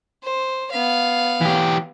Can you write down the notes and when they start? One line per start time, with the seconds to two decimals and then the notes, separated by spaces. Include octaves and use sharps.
0.23 C5
0.71 B3 F5
1.41 E3 G4